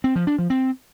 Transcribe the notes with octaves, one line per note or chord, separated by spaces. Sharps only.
C4
F3
D4
F3
C4